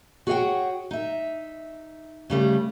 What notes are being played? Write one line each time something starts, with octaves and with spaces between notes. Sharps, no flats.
F#4 G#4 C#5 D5 F#5 G5
D#4 E5
C#3 G3 A3